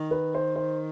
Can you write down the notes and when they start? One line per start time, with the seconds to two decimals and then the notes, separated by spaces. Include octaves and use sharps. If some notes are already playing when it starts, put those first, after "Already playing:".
Already playing: D#3
0.11 B4
0.34 C5
0.56 C5